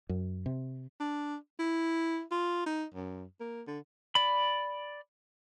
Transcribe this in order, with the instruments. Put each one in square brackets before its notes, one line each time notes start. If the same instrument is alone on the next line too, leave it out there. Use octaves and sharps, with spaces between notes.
[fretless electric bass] F#2
C3
[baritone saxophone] D4
E4
F4
D#4
F#2
A#3
D3
[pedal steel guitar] D5 B5